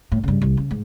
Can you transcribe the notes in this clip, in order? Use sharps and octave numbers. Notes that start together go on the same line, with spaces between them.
A2
G2 C#3
C2
C#3
G#2